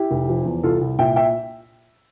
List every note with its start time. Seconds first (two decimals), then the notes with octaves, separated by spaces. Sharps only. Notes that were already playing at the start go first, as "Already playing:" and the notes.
Already playing: E4 G4
0.11 F1
0.28 F3
0.45 E2
0.63 C2 F4 A4
0.81 C2
0.99 A#2 E5 G5
1.16 E5 G5